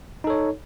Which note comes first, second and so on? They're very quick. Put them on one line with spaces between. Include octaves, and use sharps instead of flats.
D#4 A4 C#5